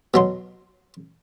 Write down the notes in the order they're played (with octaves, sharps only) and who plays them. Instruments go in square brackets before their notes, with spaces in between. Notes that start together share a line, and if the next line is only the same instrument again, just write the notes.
[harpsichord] B2 F#3 C6